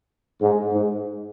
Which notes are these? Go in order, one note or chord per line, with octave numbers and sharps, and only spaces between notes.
G#2
G#2